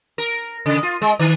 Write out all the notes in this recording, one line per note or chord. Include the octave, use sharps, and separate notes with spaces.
A#4
C#3
F4
G#3
D#3